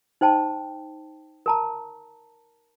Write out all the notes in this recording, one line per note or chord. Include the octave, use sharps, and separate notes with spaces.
D#4 C5 G5 A5
A#4 A5 A#5